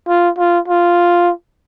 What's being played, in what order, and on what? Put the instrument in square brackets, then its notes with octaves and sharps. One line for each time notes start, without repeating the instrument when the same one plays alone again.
[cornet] F4
F4
F4